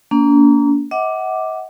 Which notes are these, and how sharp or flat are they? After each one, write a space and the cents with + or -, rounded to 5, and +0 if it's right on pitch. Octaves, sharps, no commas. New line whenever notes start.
A#3 +0 D4 -45
D#5 +45 F#5 +10 D6 +0